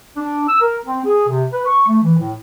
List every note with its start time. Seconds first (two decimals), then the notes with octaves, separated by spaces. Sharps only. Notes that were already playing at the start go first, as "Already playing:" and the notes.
0.17 D4
0.48 E6
0.62 A#4
0.84 C4
1.06 G#4
1.29 C3
1.53 B4
1.66 C#6
1.87 A3
2.03 E3
2.18 A2